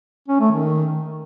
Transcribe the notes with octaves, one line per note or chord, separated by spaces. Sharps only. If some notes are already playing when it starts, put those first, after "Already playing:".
C#4
A3
D#3